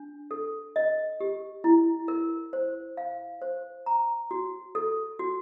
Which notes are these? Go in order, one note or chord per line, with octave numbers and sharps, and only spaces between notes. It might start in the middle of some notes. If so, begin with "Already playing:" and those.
Already playing: D4
A4
D#5
G4
E4
A#4
C5
F5
C5
A#5
F#4
A4
F#4